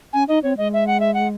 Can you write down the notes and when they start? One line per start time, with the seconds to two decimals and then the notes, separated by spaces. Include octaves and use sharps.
0.13 C#4 G#5
0.28 D#4 D#5
0.43 C4 C#5
0.58 G#3 D#5
0.73 E5
0.87 F#5
1.00 E5
1.14 F#5